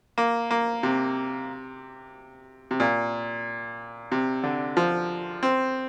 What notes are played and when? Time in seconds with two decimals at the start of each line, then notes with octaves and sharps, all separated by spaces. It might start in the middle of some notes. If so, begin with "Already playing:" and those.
0.18 A#3
0.51 A#3
0.83 C3
2.71 C3
2.80 A#2
4.12 C3
4.43 D3
4.77 F3
5.43 C4